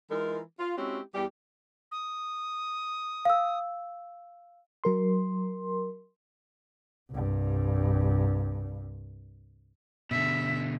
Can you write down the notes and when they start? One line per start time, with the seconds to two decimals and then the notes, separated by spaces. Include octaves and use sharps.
0.11 E3 G#3 D#4 F4 A#4
0.59 F4
0.78 G#3 C4 C#4 E4 F#4 G4
1.15 E2 E3 G3 G4
1.91 D#6
3.25 F5 E6
4.84 F#3 A#4 C6
7.10 C2 G2
10.11 B2 D3 E5